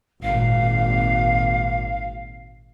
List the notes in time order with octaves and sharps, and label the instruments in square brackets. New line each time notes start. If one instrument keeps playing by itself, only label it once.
[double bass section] G#1 A#2 [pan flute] F5